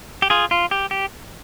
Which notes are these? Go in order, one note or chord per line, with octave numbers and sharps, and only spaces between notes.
G4
F4 G#4
F4
G4
G4